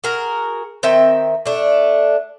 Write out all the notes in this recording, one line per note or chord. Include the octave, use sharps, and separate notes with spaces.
F#4 G#4 A#4
D#3 C4 E5 G5
A3 D4